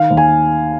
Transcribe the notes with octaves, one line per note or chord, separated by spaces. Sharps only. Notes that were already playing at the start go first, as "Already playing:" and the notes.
Already playing: D#3 F5
D#2
G#5